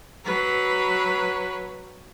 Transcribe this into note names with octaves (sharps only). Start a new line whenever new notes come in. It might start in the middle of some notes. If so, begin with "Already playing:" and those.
F#3 B4